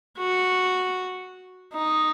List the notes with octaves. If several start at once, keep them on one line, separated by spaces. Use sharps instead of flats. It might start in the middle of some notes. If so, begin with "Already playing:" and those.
F#4
D#4